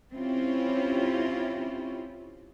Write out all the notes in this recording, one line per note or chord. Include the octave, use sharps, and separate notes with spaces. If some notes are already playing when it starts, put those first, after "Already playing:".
C4 C#4 E4 F4 G4